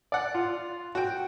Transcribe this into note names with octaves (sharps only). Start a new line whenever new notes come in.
D5 F#5
F4
F#4 G5